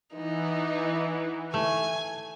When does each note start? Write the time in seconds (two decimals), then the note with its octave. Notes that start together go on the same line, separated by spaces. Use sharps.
0.15 E3 B3 D#4
1.54 A3 G#5